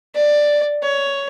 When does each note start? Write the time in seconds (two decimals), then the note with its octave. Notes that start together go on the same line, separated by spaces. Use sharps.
0.15 D5
0.82 C#5